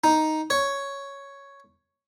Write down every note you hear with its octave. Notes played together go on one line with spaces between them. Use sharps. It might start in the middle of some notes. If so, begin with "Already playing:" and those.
D#4
C#5